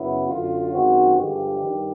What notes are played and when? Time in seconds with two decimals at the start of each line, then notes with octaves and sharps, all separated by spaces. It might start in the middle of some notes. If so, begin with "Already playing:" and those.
Already playing: F#2 C#3 F#3 B3 E4
0.29 F#2 D3 F#3 F4
0.72 F#2 D#3 G#3 C4 F#4
1.15 G2 D3 F3 G#3 G4
1.59 G2 D#3 G3